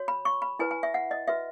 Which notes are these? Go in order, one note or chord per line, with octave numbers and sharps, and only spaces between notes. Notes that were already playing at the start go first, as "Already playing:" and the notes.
Already playing: F#4 C#5
B5
C#6
B5
E4 B4 G#5
G#5
E5
F#5
D#5
F#4 B4 E5